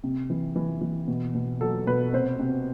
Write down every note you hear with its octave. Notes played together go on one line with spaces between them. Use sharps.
C3
E3
E3
E3
B2
B2
F#3 A4
B2 B4
C3 C5
C3